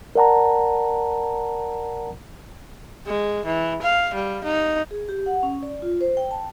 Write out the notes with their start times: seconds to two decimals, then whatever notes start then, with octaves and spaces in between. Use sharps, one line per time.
0.15 A#4 D5 F#5 A5 A#5
3.06 G#3
3.45 E3
3.82 F5
4.14 G3
4.44 D#4
4.91 G#4
5.09 G4
5.26 F#5
5.43 C#4
5.63 D5
5.82 F4
6.01 C5
6.17 G5
6.31 A5